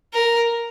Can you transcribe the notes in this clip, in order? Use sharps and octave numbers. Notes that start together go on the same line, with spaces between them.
A#4